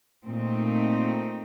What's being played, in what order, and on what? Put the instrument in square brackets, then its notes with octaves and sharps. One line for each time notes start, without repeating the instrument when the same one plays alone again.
[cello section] A#2 A3 C4 D#4